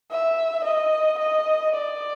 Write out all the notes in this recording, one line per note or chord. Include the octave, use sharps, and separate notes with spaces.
E5
D#5
D#5
D5